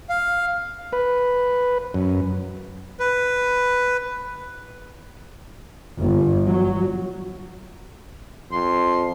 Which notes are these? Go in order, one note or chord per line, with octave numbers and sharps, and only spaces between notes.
F5
B4
F#2
B4
G1
F#3
F2 C6